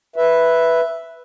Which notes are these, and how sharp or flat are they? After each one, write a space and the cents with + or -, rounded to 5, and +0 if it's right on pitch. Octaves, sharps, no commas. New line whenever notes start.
B4 +0 E5 +0